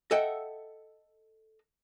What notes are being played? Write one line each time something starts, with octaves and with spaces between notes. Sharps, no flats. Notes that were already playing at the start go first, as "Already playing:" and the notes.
A4 D#5 E5 F#5 G5